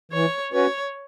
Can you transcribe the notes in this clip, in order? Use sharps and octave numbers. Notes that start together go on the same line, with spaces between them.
E3 C#5
C#4 F#4 B4 C#5